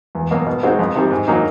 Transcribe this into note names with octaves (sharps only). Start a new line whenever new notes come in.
E2
B2 F#3 A#3
B2
G#3 C4 D#4 F#4
F2
C3 D#3 G3
G#2
D#3 F#3 A#3 D#4